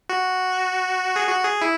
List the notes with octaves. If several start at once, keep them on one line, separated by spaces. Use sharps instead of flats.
F#4
G#4
F#4
G#4
E4